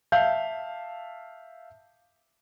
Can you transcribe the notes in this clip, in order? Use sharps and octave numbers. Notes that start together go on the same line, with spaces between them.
E5 F5 A5 G6